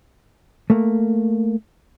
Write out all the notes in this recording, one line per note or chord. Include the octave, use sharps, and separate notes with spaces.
A3 A#3